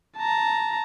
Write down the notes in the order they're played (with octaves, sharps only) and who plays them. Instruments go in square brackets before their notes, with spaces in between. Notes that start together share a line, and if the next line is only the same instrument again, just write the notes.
[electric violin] A5 A#5